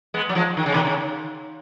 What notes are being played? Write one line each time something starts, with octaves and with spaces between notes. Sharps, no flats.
G#3 B3
F#3
F3 G#3
D#3
C#3
B2 D#3
C#3